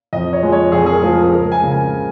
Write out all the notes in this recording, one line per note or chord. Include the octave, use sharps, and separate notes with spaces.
F2 D#5
C#5
F3 G#3
C#5
F2 G#4
G#4
A#4
F3 G#3
A#4
G#4
C#2 A#4
G#5
C#3 G#3
G#5